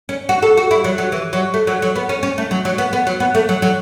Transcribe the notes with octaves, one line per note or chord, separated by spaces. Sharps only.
C#4
F#4
A4
F#4
E4
F#3
F#3
E3
F#3
A3
F#3
F#3
B3
C#4
C#4
A3
F#3
F#3
B3
B3
F#3
B3
A3
F#3
F#3